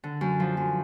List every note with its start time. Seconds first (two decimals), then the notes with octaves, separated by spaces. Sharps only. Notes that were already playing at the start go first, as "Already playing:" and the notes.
0.04 D3
0.21 F#2
0.40 F3
0.57 F#2